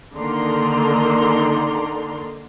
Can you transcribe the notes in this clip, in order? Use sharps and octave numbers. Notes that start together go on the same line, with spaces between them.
D3 D#3 A#3 D5 A#5 C6